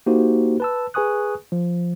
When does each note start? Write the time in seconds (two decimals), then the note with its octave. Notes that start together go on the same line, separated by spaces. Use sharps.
0.06 A#3 D#4 F#4 G4 C5
0.60 B4 A5 E6
0.94 G#4 B4 G#5 C#6 D#6 F#6
1.52 F3